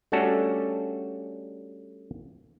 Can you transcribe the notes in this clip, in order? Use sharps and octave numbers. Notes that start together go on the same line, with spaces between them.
G3 A3 C#4 D4 F#4 A4